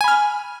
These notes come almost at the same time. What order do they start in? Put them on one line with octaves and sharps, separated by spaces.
G#5 B5 F6